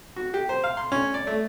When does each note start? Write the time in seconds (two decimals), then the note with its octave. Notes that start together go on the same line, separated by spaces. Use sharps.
0.16 F#4
0.34 G4
0.49 C5
0.64 F5
0.77 C6
0.92 C#4
1.14 D5
1.27 A3